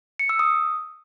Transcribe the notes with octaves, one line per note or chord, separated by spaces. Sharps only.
C#7
E6
D#6